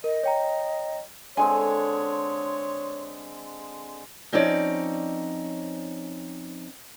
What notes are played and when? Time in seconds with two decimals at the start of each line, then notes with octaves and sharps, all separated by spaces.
0.04 A#4 D#5
0.23 C#5 G5 A#5
1.37 D3 G#3 C4 C#5 G#5
4.32 F3 C4 C#4 D#4 C#5 D5